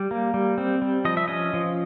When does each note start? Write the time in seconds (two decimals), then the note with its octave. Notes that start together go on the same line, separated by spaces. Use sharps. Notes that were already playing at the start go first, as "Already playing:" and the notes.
Already playing: G3 D5
0.11 A#3
0.34 G3
0.58 C4
0.82 G3
1.05 F3 D#5
1.17 E5
1.28 C#4 D#5
1.54 F3